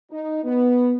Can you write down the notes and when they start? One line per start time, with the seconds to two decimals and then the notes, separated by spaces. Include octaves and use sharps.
0.10 D#4
0.44 B3